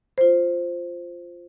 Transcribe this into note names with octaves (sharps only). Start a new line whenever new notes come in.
F4 C5